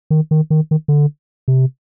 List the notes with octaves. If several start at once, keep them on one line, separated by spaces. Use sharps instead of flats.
D#3
D#3
D#3
D#3
D3
C3